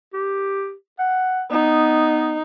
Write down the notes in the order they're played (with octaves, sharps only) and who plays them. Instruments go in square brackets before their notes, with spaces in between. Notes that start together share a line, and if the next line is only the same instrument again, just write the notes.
[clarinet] G4
F#5
[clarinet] B3 [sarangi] D#4